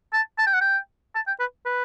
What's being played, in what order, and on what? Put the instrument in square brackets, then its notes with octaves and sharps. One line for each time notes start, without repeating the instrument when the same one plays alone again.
[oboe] A5
A5
G5
F#5
G5
A5
G5
B4
B4